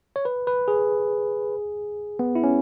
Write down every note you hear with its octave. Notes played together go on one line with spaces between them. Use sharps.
C#5
B4
B4
G#4
B3
E4
C#4